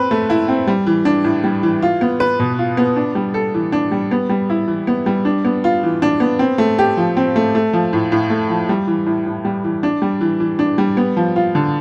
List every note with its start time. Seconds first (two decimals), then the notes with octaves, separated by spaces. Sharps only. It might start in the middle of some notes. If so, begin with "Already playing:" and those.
Already playing: C4 B4
0.11 A3
0.30 E4
0.48 C4
0.67 G3
0.87 E3
1.05 D4
1.24 A2
1.44 G3
1.63 E3
1.82 F4
2.01 B3
2.20 B4
2.40 B2
2.59 F4
2.77 B3
2.96 D4
3.15 G3
3.34 A4
3.54 E3
3.72 D4
3.92 G3
4.11 B3
4.29 G3
4.50 E4
4.68 E3
4.87 B3
5.06 G3
5.25 D4
5.45 B3
5.64 F4
5.83 E3
6.02 D4
6.20 B3
6.39 C4
6.58 A3
6.79 G4
6.97 F3
7.17 C4
7.36 A3
7.55 A3
7.73 F3
7.93 A2
8.12 A2
8.30 A3
8.50 F3
8.69 G3
8.87 E3
9.06 A2
9.26 A2
9.45 G3
9.64 E3
9.83 D4
10.02 G3
10.21 E3
10.40 E3
10.59 D4
10.78 G3
10.97 B3
11.17 F3
11.36 F4
11.55 D3